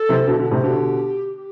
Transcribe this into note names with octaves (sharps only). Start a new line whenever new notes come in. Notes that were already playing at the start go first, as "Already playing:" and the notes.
Already playing: A4
C3 E3
B2 D3
B2 D3
A2 C3
B2 D3 G4
G4